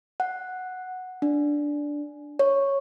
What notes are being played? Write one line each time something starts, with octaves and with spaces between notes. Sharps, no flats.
F#5
D4
C#5